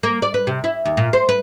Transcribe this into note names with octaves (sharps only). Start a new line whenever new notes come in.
A#3
D5
B4
C3
E4
D#2
A#2
C5
B4